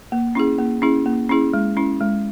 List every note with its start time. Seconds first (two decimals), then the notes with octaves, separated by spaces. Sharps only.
0.12 A#3
0.35 C#4 E4 G#4
0.58 A#3
0.82 C#4 E4 G#4
1.06 A#3
1.29 C#4 E4 G#4
1.53 G#3
1.77 C#4 E4
2.01 G#3